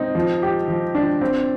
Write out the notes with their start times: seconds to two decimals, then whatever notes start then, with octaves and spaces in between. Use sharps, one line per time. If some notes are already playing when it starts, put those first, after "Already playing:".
Already playing: C4 D#4
0.15 F3
0.42 G4
0.68 F3
0.95 D4
1.21 C4